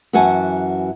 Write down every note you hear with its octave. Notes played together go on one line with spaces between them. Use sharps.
F#2 E3 F#4 F#5 G#5 A5